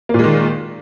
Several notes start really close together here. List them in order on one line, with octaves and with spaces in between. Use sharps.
A#3 A#2 G#3 D#3